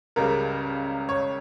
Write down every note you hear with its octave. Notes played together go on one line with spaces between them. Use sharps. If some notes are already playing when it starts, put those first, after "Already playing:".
C#2 C#3 G3 A#4
C#5